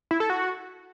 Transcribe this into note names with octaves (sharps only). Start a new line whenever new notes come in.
E4
A4
F#4